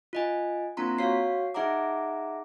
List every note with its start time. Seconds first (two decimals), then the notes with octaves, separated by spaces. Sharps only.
0.13 F4 D#5 G#5
0.77 A#3 C4 D4 F4 A#5 C6
0.98 F#4 C#5 F5 C7
1.54 D#4 G#4 E5 F#5 A#5 D6